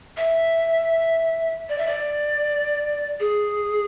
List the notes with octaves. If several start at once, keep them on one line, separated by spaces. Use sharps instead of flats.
E5
D5
E5
D5
G#4